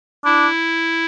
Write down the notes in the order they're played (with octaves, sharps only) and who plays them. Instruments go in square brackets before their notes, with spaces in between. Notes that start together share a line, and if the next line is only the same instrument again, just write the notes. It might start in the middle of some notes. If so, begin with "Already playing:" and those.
[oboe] D4 [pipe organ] E4